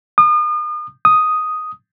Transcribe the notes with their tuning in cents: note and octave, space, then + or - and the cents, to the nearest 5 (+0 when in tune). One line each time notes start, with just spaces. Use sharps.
D#6 -40
D#6 +0